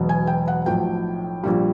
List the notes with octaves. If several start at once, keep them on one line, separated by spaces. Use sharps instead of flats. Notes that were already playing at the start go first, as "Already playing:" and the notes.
Already playing: E1 E2 B2 F#3 B3
G#5
G5
F#5
B1 A2 F3 G5
A#1 A#2 G3